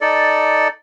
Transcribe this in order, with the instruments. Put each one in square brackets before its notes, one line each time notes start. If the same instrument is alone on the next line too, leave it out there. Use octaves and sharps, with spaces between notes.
[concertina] D#4 A4 D5